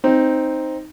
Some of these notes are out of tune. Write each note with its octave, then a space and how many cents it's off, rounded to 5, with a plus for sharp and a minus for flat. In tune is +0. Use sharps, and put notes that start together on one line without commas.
C4 +0 D#4 +0